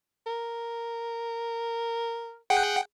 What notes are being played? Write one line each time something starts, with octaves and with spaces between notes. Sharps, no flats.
A#4
G#4 F#5 G5